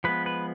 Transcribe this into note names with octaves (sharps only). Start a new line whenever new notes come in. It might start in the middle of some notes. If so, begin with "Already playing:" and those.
F3 G#3 B3 B4
B4